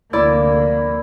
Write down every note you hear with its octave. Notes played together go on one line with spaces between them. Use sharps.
F1 D2 A#3 E4 D5